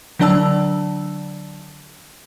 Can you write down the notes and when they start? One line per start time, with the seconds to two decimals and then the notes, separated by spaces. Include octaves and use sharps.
0.19 D3 F#3 D4 D5 A5 E6